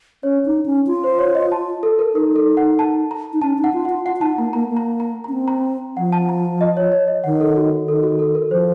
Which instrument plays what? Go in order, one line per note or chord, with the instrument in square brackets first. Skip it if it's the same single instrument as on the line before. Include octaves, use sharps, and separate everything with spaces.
[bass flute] C#4 [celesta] C#5
[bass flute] D#4
C#4
F4
[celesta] C5
C#5
D#5
A5
A4
A#4
[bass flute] D#4 [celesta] A#4
[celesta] A4
F#5
A5
A#5
[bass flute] D#4
[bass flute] C#4 [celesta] A5
[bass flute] D#4
[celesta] F#5
[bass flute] F4
[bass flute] F4 [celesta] F#5
[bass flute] F4 [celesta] F#5
[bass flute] F4
[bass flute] D#4 [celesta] A5
[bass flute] A#3 [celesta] A#5
[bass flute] A#3 [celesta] A#5
[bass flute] A#3
[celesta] A#5
A#5
[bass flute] C#4 [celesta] A#5
[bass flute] C4
[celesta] A#5
[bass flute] F3 [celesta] F#5
[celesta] A5
A#5
A5
D#5
C#5
C#5
D#5
[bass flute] D#3 [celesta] F#5
[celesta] A4
F#4
[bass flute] D#3 [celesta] A4
[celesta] F#4
A4
A#4
[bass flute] F3 [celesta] C5